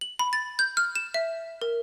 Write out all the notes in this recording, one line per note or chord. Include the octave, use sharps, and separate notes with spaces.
F#7
B5
A6
G6
F6
E7
E5
A#4